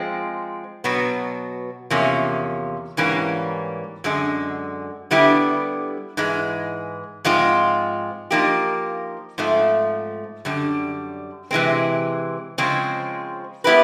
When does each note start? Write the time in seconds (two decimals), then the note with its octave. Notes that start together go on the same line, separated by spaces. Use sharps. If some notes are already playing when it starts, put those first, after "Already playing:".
Already playing: F3 G#3 C4
0.84 B2 F#3 B3
1.90 E2 C3 F3 A#3 C#4
2.97 G#2 E3 G3 A#3 C#4
4.04 F#2 D3 G#3
5.11 D3 G3 B3 E4 G4
6.17 G#2 E3 G#3
7.25 G#2 F3 G#3 C4 F4
8.31 F3 A#3 D#4 G4
9.38 G#2 F3 A3 C4
10.45 F#2 D3 G3
11.51 C3 E3 G#3 C4
12.58 C#3 F3 G#3 C4
13.64 G3 B3 E4 G4 B4